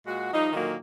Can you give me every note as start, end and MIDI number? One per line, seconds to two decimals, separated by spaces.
0.06 0.28 46
0.06 0.28 56
0.06 0.28 66
0.32 0.50 53
0.32 0.50 55
0.32 0.50 63
0.52 0.74 46
0.52 0.74 50
0.52 0.74 51
0.52 0.74 54
0.52 0.74 58